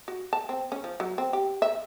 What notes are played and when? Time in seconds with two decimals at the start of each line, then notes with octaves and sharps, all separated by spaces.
0.08 F#4
0.33 A5
0.49 C4
0.72 C#4
0.84 F3
1.00 F#3
1.18 C4
1.33 G4
1.62 E5